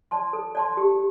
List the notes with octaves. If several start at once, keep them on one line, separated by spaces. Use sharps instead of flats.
D5 A5 C6
A4
D5 A5 C6
G4